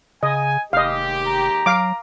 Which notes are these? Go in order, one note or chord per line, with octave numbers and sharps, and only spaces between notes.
C#3 D#5 G#5
F1 D#2 G#3 G4 D#5 F5
A#5
F#3 F5 D6